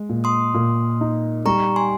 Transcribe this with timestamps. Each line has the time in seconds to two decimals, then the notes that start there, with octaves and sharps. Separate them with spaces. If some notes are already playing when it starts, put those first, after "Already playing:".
Already playing: G#3
0.09 A#2
0.24 C6 D#6
0.54 A#2
1.01 D#4
1.45 G3 A#5 C#6
1.76 G#5 C6